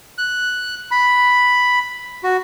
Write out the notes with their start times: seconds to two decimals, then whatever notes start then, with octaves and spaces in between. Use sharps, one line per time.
0.18 F#6
0.91 B5
2.24 F#4